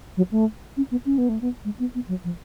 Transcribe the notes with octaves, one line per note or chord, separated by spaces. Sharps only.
F#3
A3
C#4
B3
C#4
B3
A3
B3
G#3
B3
B3
F#3
F3